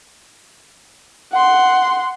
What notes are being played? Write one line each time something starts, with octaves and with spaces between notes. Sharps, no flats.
F#5 C6